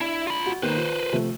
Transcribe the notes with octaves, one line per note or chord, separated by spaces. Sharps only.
D4 E4
F4 B5
F#4
D#3 A#3 B4 C5
F4
C3 F3 A3